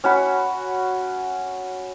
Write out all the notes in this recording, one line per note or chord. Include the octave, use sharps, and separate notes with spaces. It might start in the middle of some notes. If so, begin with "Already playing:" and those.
C#4 F#4 B5